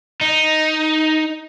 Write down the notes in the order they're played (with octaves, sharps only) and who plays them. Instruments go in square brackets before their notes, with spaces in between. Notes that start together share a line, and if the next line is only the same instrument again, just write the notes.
[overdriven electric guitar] D#4